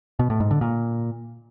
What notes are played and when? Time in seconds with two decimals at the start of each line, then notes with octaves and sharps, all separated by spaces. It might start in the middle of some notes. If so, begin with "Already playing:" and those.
0.19 B2
0.30 A2
0.40 G#2
0.51 D3
0.61 A#2